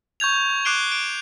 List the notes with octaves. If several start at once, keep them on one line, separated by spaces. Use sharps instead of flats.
C#6 G6 G#6 F7
D6 F#6 C7 D7 G7
D7